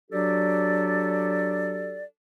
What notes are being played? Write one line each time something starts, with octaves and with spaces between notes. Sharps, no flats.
F#3 D4 F#4 G4 A4 D5